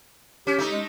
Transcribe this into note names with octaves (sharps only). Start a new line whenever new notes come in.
C#4 G4
A3 D#4
G#3